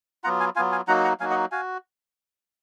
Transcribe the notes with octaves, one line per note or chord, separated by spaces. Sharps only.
F#3 B3 F4 F#5 A#5
F5 G#5
F#3 B3 F4 F5 G#5
F5 G#5
F#3 A#3 D#4 F#4 F#5 A#5
F#5 A#5
F#3 A#3 D#4 F#4 F5 G#5
D#5 F#5
F#4 F5 G#5